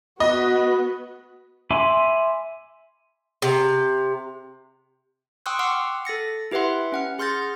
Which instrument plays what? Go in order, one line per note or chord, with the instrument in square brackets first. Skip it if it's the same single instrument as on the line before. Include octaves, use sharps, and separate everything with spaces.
[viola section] B3 F#4 B4 [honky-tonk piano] D#5
[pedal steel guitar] E5 G#5 B5 C6 D6
[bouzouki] C3
[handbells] G5 C6 C#6 D#6 E6 F#6
F#5 C6 D6 E6 F6 C7
A4 A6 A#6 C#7
E4 G4 B4 E5 F#5 C6
C#4 F#5 F6
G#4 C6 F6 G6 A6 A#6